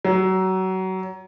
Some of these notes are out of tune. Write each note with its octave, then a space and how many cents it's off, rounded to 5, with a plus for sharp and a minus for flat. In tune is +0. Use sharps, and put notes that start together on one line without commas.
F#3 +25